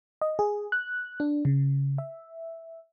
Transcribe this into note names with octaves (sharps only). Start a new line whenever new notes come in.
D#5
G#4
F#6
D4
C#3
E5